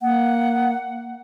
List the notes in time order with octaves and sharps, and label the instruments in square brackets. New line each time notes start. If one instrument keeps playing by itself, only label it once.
[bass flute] A#3 [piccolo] F#5